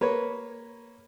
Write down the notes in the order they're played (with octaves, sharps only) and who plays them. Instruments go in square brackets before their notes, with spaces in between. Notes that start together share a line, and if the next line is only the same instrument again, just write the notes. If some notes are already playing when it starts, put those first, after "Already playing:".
[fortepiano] A#3 C#5 [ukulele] B4